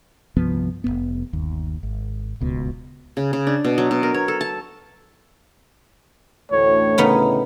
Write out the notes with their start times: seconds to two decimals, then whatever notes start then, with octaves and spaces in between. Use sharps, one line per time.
0.36 C2 G2 F3 B3
0.84 F1 E2 B3
1.33 G1 D#2
1.83 G#1
2.41 D1 C#2 B2
3.17 C#3
3.33 C#3
3.47 D4
3.64 B2
3.78 F#3
3.91 B2
4.03 A#4
4.14 C#5
4.28 A4
4.41 A5
6.52 A1 D2 A2 C#5
6.98 C#3 B3 D#4